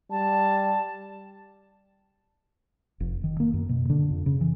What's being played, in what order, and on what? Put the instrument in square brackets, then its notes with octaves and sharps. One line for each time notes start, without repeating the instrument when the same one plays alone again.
[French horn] G3 [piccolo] A5
[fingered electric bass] F1
D#3
A#3
F#2
B2
D3
F2
C#3
E3